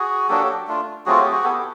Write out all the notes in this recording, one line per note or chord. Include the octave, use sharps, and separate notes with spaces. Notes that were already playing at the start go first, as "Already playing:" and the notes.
Already playing: F#4 G#4
F#3 A#3 D4 F#4 G4 A4
A3 D4 F4
F#3 A3 C4 F4 F#4 G#4
G4
F#4 G#4
B3 E4 G4 A4